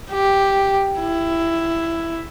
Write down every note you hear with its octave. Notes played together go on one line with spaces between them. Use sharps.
G4
E4